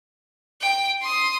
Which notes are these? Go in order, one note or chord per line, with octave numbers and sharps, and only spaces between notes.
G5
C6 D#6